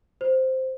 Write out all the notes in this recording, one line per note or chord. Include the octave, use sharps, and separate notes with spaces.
C5